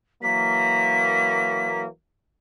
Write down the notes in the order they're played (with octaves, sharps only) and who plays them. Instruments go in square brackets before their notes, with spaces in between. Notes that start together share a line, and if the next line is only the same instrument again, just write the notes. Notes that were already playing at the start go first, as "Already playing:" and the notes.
[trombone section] E3 F#3 A#3 [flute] B6